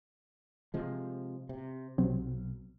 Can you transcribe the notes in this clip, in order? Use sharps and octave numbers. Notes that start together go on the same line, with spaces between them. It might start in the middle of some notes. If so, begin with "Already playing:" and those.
C3 F3 G#3
C3
B1 C3 F#3 C4